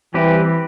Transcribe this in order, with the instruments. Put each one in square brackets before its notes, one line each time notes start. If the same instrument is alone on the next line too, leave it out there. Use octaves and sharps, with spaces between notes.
[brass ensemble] E3 [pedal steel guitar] G3 C4 G4 B4